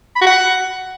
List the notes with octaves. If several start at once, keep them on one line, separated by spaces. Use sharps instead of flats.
B5
F#4
F#5